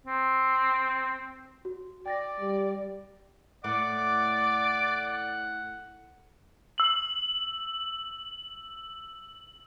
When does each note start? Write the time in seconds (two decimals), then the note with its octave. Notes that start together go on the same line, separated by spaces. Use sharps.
0.06 C4
1.65 F#4
2.06 D5 G5 A6 A#6
2.40 G3
3.64 A2 D5 F#5 D6
6.78 E6 F#7